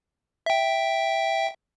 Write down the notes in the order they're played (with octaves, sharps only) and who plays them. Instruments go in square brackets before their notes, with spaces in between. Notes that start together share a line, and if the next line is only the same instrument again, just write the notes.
[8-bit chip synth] E5 G5